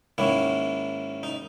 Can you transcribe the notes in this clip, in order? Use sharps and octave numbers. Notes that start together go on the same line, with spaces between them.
G#2 D#3 A#3 C#4 E4
D#4